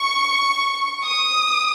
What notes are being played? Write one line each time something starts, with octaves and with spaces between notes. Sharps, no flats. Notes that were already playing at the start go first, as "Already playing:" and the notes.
Already playing: C#6
D#6